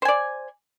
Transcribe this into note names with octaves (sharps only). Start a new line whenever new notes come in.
C5 D5 G#5